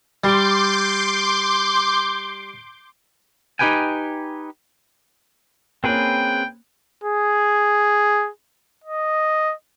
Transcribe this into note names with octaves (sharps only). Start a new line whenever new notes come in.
G3 C6 D6 G6
D#4 F4 G4 B4 G5 G#5
A#3 C4 C#4 G#4 B4 G5
G#4
D#5